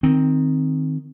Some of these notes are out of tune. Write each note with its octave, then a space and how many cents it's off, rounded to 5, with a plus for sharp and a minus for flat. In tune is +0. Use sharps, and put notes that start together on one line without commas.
D#3 +0 C4 +0